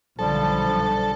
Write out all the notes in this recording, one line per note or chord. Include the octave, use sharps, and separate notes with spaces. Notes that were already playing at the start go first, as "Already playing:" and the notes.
B1 D3 F3 G3 A4